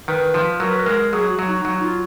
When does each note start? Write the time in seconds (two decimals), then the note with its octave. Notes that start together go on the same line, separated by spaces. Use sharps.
0.08 D#3 B4
0.34 F3
0.60 F#3 A#4
0.70 B4
0.80 A#4
0.86 G#3
1.12 F#3 G#4
1.30 F#4
1.39 F#3
1.48 D#4
1.65 F#3 D#4
1.82 F4